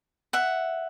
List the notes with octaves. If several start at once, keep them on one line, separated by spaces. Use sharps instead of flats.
E5 F#5